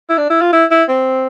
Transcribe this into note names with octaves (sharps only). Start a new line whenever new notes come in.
E4
D4
E4
F4
E4
E4
C4